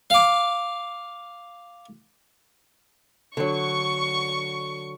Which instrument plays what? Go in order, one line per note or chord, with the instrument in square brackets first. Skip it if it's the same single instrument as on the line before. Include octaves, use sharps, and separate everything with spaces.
[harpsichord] F5 D6
[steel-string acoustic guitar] D3 F#3 [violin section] C#6